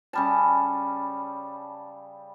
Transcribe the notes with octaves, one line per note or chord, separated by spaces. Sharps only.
C#3 G3 A5